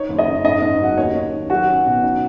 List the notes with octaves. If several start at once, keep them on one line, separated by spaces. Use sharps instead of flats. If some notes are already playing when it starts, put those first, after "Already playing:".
Already playing: D#4 C#5
F#1
D#5
F#1
G#2 D#5
G#2
F#3 F#5
D#2 C#5
D#2
D#3
F#3 F#4
C#4
B2
D#4